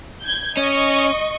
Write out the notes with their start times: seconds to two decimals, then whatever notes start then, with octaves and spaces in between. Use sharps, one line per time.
0.23 G6 G#6
0.57 C#4 D#5 C#6